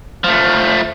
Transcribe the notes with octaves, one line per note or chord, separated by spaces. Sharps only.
F3 A3